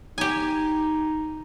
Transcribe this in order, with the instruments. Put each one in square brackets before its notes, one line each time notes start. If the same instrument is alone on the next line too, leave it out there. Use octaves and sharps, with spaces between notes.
[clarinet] D#4 [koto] G4 G#5